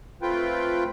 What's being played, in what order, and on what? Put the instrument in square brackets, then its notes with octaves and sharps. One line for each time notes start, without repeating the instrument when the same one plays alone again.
[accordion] A3 C4 F4 B4 G5